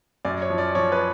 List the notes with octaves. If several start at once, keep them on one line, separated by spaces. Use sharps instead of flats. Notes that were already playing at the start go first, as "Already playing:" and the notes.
F#2 D5
C#5
F3
D5
F3 C#5
B4